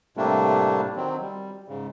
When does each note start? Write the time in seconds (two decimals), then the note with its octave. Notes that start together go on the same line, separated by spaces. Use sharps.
0.17 A2 C3 G3 A3 A#3 D4
0.96 D#3 F#3 C4
1.21 G3
1.68 G#2 C#3